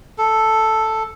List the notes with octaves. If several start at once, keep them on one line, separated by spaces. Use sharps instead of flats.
A4